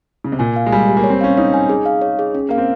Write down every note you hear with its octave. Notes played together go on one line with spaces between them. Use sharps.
C#3
C3
A#2 G#5
F5
G#3
G3 G#5
G4
A#3
C#5
C4
C#4 F5
D#4 C#5
G#5
G#4
F5
C#5
G#4
C#4
A#3 F5
C4